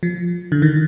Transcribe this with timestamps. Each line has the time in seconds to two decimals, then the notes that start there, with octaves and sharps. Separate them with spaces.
0.03 F3
0.52 D3
0.62 D#3